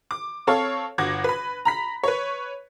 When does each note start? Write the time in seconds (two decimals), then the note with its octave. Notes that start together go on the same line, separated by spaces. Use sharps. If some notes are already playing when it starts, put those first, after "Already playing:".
0.11 D6
0.47 C4 A4 C#5 F5
0.98 G1 F#4 D6 G#6 A#6
1.24 B4 B5
1.65 A#5 B5 B6
2.04 B4 C#5